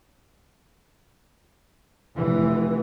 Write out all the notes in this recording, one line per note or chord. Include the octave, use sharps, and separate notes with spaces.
F1 E3